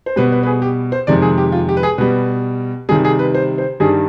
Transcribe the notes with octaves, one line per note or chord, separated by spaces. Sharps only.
C5
B2 G3 B4
B4
B4
G#4
G4
C5
F2 C3 D#3 G#3 D5
G#4
G4
F4
G4
B4
G#4
B2 G3 B4
C3 D#3 G3 G#4
G#4
B4
C5
C5
G2 D#3 G3 G#4